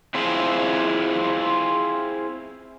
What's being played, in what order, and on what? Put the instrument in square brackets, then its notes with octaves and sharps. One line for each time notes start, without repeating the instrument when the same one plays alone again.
[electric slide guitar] C4 E4 F4 G#4 C5